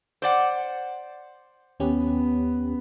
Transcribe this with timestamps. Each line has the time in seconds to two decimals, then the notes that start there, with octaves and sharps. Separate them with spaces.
0.22 C5 D5 F#5
1.80 D#2 B3 C#4 G4